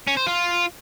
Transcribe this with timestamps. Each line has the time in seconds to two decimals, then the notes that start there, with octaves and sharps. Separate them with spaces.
0.07 C#4
0.17 C5
0.27 F4